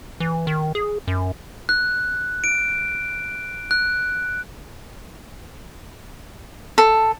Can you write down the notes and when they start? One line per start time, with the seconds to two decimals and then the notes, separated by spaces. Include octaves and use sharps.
0.20 E3
0.47 D#3
0.75 G#4
1.08 F#2
1.69 F#6
2.44 D7
3.71 F#6
6.78 A4